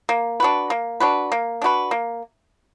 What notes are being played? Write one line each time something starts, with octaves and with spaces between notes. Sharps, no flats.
A#3
D4 F#4 B4
A#3
D4 F#4 B4
A#3
D4 F#4 B4
A#3